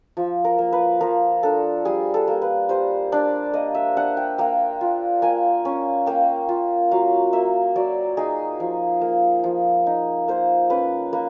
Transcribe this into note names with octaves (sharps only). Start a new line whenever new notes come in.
F3
A#4
A#3
B4
F3 A#4
D4 A4
G3 G#4
A4
A#3
B4
G3 C5
D4 D5
A#3 D#5
E5
D4 F#5
G5
A#3 G5
F4
A#3 G#5
C#4
A#3 G5
F4
F#3 F5
A#3 E5
F#3 D5
D#4 G#4
F3
A#3
F3
D#4
A#3 C5
C#4 B4
A#3 B4